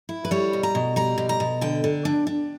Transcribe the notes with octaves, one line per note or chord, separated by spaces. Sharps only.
E4
B4
G3 C#5
B2
A#5
B2
G3 A#5
B2
A#5
B2
D3 G5
D3
D4
D4